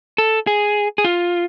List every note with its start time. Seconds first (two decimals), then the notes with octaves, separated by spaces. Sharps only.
0.18 A4
0.47 G#4
0.98 G#4
1.05 F4